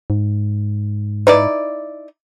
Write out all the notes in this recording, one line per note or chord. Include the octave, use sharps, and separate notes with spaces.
G#2
D#4 E4 B4 D5